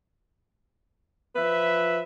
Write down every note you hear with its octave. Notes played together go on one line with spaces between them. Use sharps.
F3 B4 E5